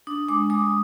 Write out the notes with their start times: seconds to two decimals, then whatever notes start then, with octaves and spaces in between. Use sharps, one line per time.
0.07 D4 D#6
0.28 G#3 D6
0.50 G#3 D#6